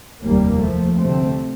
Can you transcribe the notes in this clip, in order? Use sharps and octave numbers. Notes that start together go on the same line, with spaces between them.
F1 D#2 G3 A#3
F3 A3
D2 C3 A3 C4